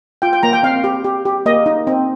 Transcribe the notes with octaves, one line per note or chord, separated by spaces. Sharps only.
F4 G5
G5
A#3 A#5
G5
C4 F5
G4
G4
G4
A#3 D#5
D#4
C4